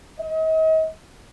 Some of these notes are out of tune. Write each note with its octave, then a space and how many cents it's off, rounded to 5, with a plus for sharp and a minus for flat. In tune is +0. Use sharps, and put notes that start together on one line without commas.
D#5 +40